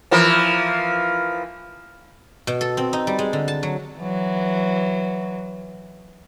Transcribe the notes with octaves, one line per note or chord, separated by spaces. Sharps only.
E3 F3 A#3
B2
A4
C4
D#4
G3
G#3
D3
A5
F#3
E3 F#3